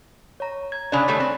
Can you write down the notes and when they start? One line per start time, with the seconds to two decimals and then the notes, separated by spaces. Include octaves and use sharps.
0.40 C#5 A#5
0.72 G#6
0.92 C#3 D4 C#5 B5 F#6
1.08 D#3 G3 A3
1.20 C4